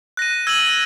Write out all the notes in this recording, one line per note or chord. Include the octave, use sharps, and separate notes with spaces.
F#6 A#6 D#7
E6 G#6 D#7 F#7